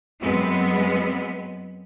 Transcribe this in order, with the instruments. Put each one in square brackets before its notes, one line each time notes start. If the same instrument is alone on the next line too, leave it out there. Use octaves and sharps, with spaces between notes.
[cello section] F#2 G#3 B3 C4